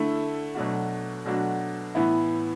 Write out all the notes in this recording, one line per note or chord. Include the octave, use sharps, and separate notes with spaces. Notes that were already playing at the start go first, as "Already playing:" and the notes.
Already playing: D3 A3 E4
B2 F#3 A3 D4 F#4
B2 F#3 A3 D4 F#4
A2 E3 B3 E4